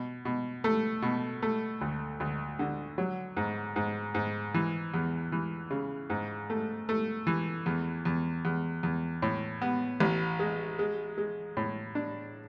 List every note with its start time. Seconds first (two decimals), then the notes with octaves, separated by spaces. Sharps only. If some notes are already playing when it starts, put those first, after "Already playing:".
Already playing: B2
0.25 B2
0.64 A3
1.02 B2
1.42 A3
1.81 D2
2.20 D2
2.59 D3
2.98 F#3
3.37 G#2
3.76 G#2
4.15 G#2
4.54 E3
4.94 E2
5.32 E3
5.70 C#3
6.10 G#2
6.50 A3
6.89 A3
7.27 E3
7.66 E2
8.05 E2
8.45 E2
8.83 E2
9.22 A2
9.62 B3
10.00 A1
10.39 G#3
10.79 G#3
11.18 G#3
11.57 A2
11.95 D4